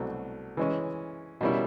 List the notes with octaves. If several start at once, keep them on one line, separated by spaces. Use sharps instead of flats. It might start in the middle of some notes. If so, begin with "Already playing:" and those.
Already playing: C2 B2 F#3 A3
E3 G#3 C#4
B2 G3 A#3 C#4 E4